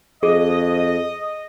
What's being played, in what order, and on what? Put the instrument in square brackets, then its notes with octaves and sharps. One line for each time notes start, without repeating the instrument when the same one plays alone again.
[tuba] F2 [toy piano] G#4 [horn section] D#5